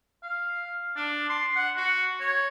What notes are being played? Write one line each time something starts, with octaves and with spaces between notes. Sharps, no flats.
F5
D4
C6
F#5
F#4
C#5